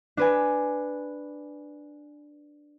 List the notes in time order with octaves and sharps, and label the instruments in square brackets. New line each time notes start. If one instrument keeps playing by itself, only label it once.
[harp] D4 B4 G#5